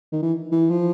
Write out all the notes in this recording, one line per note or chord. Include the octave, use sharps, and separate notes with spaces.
D#3
E3
E3
F3